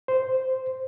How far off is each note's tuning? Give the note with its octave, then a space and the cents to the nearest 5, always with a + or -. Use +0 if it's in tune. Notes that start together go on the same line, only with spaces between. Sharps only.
C5 -5